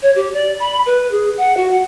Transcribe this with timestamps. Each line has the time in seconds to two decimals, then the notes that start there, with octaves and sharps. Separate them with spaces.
0.02 C#5
0.16 G4
0.34 D5
0.60 B5
0.86 B4
1.11 G#4
1.37 F#5
1.57 F#4
1.71 F#5